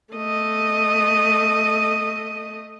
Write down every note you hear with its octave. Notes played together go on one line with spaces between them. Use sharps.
A3 D#5